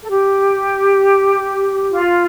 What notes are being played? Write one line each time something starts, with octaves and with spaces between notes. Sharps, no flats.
A4
G4
F4